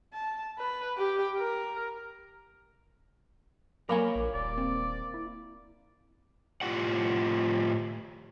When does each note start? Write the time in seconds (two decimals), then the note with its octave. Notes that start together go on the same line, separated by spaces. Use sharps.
0.13 A5
0.58 B4
0.97 G4
1.38 A#4
3.89 F#3 A#3 A#4 C#5 G#5 B5 D6
4.16 A#1
4.34 D#1 D5
4.58 C4
5.14 E4
6.61 A2 F4 G4 F#5